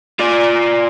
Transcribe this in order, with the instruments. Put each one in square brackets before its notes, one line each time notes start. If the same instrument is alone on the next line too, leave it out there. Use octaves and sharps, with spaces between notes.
[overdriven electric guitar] F4 D5